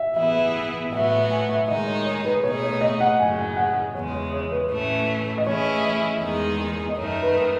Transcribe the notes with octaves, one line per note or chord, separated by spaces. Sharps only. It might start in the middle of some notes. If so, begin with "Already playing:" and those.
Already playing: E5
E3 B3 E4 G#4 E5
A2 F#3 B3 F#4 E5
E5
G#5
E5
D#3 G#3 D#4 G#4 D#5
C#5
C#5
B4
B2 A3 D#4 G#4 C#5
C#5
D#5
F#5
F#2 C#3 F#3 G#5
G#5
F#5
E2 C#3 G#3 C#5
C#5
C#5
B4
A2 E3 A3 C#4
D#5
E3 A3 C#4 E4 G#4 C#5
D#5
E2 D#3 G#3 D#4 G#4
D#5
F#2 D#3 A3 D#4 C#5
B4